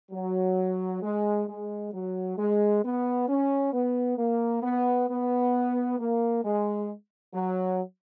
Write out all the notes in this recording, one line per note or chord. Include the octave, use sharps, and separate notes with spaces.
F#3
G#3
G#3
F#3
G#3
B3
C#4
B3
A#3
B3
B3
A#3
G#3
F#3